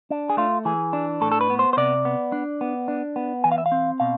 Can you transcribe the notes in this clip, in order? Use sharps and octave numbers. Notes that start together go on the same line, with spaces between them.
D4
G#4
A3 F4
E3 G#4
D4
A2 A4
A4
B4
B3
C5
C5
C3 D5
B3
D4
B3
D4
B3
E3 G#5
F5
E5
F5
C4
B2 F5